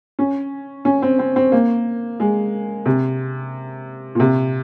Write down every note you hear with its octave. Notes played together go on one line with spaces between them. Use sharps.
C#4
C#4
C4
C4
C4
A#3
G#3
C3
A#2
C3